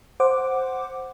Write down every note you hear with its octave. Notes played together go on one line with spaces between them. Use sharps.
C5 F#5 D6